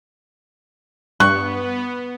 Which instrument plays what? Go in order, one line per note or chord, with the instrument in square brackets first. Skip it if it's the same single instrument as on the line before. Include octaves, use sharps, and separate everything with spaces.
[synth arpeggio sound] G2 [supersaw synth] B3 [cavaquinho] C#6 [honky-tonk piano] F#6